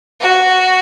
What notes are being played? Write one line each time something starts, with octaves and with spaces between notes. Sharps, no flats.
F#4